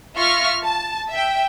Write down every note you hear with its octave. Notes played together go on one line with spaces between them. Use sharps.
F4 E5 C#6 F6 A#6
A5
E5 G5